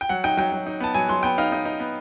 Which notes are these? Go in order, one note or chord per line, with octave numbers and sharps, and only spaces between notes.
G5
F#3 F#5
D#4 G5
F#3 G5
F#3
D#4
B3 A5
F#3 G#5
F#3 C6
B3 G5
D#4 F5
D#4
D#4
B3